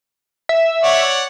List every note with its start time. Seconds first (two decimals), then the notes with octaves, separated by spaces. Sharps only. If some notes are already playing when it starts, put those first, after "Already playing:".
0.49 E5
0.83 C#5 D5 F#5